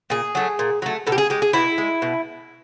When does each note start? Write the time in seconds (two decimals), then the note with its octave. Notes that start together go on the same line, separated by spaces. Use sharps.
0.10 A#2 G#4
0.35 F#3 A3
0.59 A#2
0.82 F#3 A3
1.07 B2 A4
1.12 G4
1.18 G#4
1.30 G#3 G4
1.42 G#4
1.53 B2 E4
1.78 G#3
2.02 B2